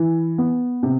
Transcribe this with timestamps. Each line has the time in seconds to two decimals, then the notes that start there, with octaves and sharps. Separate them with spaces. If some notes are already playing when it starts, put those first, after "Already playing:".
Already playing: E3
0.38 B3
0.83 C3